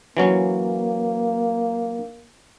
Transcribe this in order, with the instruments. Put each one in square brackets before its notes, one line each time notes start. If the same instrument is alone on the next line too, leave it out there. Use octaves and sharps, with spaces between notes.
[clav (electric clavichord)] E3 F#3 C#4 [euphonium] A#3